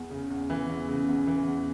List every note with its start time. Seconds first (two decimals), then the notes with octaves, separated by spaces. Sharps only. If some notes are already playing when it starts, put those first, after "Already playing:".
Already playing: E2
0.10 C#3
0.30 E2
0.50 E3
0.69 E2
0.89 C#3
1.08 E2
1.27 E3
1.47 E2